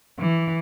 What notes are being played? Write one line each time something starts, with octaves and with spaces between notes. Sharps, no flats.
E3